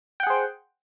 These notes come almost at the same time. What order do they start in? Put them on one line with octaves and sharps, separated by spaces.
G5 F#5 G#4 C5